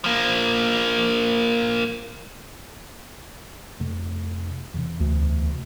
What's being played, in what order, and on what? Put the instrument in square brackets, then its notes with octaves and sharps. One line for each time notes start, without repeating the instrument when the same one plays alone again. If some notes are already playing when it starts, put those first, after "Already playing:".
[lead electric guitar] F3 A#3
[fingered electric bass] F2 C3 A3
E2 C3
[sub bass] D2